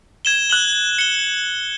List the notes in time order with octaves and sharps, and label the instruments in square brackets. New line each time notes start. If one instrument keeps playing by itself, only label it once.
[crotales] G#6 E7 G7
F#6 F#7 G7
C#7 G7